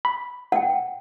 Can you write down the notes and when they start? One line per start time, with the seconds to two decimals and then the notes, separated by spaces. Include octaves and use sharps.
0.05 B5
0.52 F#5 G5